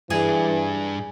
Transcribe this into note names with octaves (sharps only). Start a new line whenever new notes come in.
G2 E3 D4 G#4